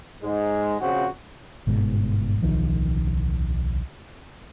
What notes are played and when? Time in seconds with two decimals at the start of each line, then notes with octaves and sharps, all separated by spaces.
0.22 G#2 G#3
0.80 A#1 C#3 C4 F#4
1.67 G1 G#2 B2
2.41 D1 B1 D#3 F3